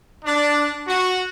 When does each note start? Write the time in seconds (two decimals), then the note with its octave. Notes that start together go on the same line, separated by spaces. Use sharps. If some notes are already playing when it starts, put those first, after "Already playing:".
0.25 D4
0.87 F#4